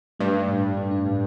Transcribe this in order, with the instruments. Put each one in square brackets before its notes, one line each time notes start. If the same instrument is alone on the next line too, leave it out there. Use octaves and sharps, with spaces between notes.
[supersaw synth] G2 [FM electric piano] A3
[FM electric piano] D4
A2
A2
A3
D4
A2